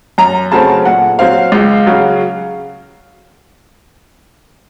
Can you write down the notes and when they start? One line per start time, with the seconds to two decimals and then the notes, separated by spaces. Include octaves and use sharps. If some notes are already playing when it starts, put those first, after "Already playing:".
0.18 F#2 A#5
0.51 C#3 F#3 A3 C4 A5
0.85 A#2 F#5
1.19 F#3 C4 F5
1.52 C#2
1.86 C#3 F#3